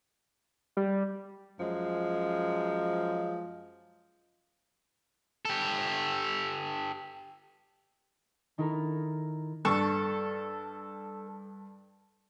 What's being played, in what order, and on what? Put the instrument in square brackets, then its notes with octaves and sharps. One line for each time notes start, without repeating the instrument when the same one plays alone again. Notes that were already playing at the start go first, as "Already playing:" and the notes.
[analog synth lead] G3
[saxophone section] F#2 F3 G#3
[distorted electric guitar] G4 A4
[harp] D#3 D#4 E4 A4 A#4
[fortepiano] G2 [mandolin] A4 C#6